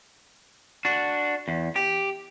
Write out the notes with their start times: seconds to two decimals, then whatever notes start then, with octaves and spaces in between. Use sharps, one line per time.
0.85 D4 F#4
1.48 E2
1.76 G4